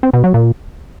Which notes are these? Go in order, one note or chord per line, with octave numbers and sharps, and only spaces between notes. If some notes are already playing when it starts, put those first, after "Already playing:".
C4
B2
F#3
A#2